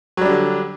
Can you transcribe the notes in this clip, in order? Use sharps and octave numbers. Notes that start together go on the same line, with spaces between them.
D3 F#3 G3 D4